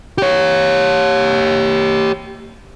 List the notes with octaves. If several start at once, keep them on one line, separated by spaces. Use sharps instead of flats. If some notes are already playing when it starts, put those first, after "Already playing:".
G4 C#5